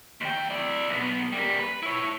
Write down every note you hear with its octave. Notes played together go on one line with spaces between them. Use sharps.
D#2 G5
E4 D5
B1 B3
G3 A#3
B4
E4 C#5